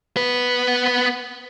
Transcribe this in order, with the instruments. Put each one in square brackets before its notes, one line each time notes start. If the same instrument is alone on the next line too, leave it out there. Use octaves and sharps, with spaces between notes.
[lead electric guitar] B3 B4